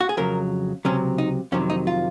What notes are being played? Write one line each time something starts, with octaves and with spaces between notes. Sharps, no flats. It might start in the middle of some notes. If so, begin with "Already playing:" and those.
F#4
G#4
F2 C#3 F#3 A#4
C#2 C3 F#3 C#4
D#4
F2 C3 D#3 F#3 C#4
D#4
F4